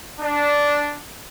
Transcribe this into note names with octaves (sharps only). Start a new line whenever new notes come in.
D4